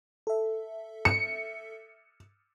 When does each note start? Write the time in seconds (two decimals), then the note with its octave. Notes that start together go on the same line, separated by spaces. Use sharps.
0.27 A4 E5
1.05 C#7